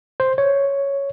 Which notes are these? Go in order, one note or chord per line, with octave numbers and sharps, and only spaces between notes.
C5
C#5